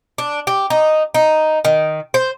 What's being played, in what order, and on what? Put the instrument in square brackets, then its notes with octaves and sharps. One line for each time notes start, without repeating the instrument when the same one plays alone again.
[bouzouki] D4
G4
D#4
D#4
D#3
C5